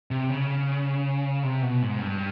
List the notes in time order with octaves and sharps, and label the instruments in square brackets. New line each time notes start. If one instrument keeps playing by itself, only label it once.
[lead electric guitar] C3
C#3
C3
B2
G#2
G2